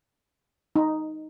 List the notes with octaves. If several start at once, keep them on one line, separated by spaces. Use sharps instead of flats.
D#4